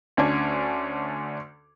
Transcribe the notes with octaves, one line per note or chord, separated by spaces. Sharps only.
D2 C#4 D4 G#6